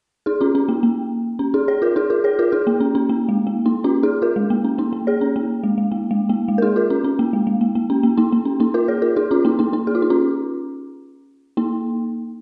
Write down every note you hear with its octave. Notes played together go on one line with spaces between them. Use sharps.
D#4 G#4
C#4 F4
C#4
A#3
A#3
C#4
D#4 G#4
G#4 C#5
F4 A#4
D#4 G#4
F4 A#4
G#4 C#5
F4 A#4
D#4 G#4
A#3
C#4
C#4
A#3
G#3
A#3
A#3 D#4
C#4 F4
D#4 G#4
F4 A#4
G#3
A#3
C#4
A#3 D#4
A#3
G#4 C#5
C#4
A#3
G#3
G#3
A#3
G#3
A#3
G#3
A#4
D#4 G#4
F4 A#4
C#4 F4
C#4
A#3
G#3
G#3
A#3
A#3
C#4
A#3
A#3 D#4
A#3
C#4
A#3 D#4
F4 A#4
G#4 C#5
F4 A#4
D#4 G#4
C#4 F4
A#3 D#4
A#3 D#4
A#3 D#4
G#4
F4
D#4
C#4 F4
A#3 D#4